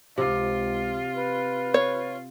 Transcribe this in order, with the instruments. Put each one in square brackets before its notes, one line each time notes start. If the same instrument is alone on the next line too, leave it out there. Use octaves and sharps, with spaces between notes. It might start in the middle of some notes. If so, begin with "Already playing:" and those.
[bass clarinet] C#2 [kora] C3 [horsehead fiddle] F4
[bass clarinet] B4
[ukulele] C#5